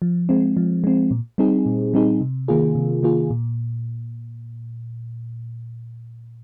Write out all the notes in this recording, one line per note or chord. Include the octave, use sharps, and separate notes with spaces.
F3
G#3 C4
F3
G#3 C4
A#2
G3 C4 D#4 G#4
A#2
G3 C4 D#4 G#4
C3
D#3 A#3 F4 G#4
C3
D#3 A#3 F4 G#4
A#2